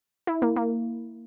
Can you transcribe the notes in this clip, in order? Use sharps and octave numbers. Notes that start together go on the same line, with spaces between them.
E4
A#3
A#3